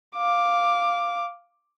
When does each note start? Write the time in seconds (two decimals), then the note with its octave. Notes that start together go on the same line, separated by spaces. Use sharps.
0.16 F5 D6